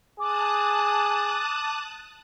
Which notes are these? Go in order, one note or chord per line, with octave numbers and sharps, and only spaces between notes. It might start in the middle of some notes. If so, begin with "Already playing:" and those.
G#4 A5 D6 D#6 F#6